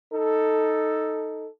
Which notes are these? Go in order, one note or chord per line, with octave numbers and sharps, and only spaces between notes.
D#4 A4